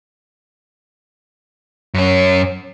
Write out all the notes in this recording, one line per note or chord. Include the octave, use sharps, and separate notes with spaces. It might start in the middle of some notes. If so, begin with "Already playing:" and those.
F#2 C#4